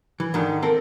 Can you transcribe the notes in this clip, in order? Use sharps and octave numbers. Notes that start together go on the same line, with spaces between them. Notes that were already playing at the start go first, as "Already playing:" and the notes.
E3
G#2 D3 D#3
C4 A4 A#4